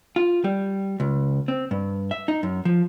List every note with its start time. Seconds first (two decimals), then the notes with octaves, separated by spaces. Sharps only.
0.16 F4
0.44 G3
1.00 C#2
1.48 C4
1.71 G2
2.11 E5
2.28 D#4
2.43 F#2
2.65 F3